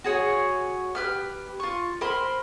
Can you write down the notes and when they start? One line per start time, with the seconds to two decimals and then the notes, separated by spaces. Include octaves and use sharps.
0.04 F#4 G#4 C#5
0.95 G4 B4 F6
1.60 F4 C#6
2.01 A#4 C5 B5 C6